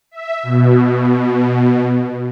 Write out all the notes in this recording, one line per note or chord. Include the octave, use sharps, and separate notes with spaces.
E5
B2